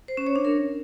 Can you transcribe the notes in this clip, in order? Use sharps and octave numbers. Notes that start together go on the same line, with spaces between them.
C5
C#4
C#5
D4
A#4